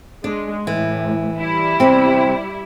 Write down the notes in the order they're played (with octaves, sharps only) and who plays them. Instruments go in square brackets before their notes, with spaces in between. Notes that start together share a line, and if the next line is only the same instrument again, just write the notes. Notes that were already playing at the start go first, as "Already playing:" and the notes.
[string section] G#3 [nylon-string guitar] D4
[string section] A2 [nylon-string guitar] E3
[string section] G3 E4
[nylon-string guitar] C3 C4